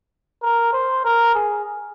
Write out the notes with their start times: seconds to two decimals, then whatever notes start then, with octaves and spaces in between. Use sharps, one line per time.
0.42 A#4
0.72 C5
1.04 A#4
1.34 G#4